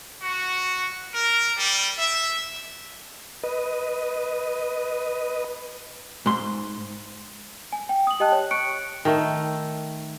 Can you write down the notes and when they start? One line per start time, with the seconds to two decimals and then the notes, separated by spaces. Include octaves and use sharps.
0.22 F#4
1.13 A#4
1.58 G3
1.98 E5
3.44 B4 D#5
6.26 G#2 C6
7.73 G#5
7.89 G5
8.07 D#6 F#7
8.20 G4 D#5 G5 A5 F#6
8.32 C#5
8.51 C#6 F#6 C#7 D7
9.05 D#3 A3